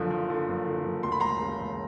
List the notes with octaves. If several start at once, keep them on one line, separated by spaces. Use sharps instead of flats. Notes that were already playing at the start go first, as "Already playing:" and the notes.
Already playing: F#1 D3 F3
F3
D3
F#1
D3
F#1
D2 C6
B5
E1 A#5 C6
C#3
E1